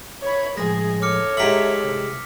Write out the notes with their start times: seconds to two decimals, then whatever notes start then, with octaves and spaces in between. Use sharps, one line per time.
0.22 C#5 B5
0.57 A2 F3 G#3 G#4 A#6
1.02 A4 C#5 D6 F6 C#7
1.37 G#2 G4 E5 A#5 B5 E6 B6
1.84 C2